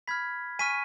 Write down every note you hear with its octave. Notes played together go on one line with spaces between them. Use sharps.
B5 F6 G#6 B6
G#5 C#6 F6 B6 D#7